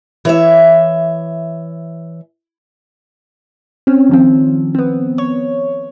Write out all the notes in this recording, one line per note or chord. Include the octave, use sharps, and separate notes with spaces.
E3 C#5 E5
C4 C#4
D#3 F3 C4
B3 C4
C#5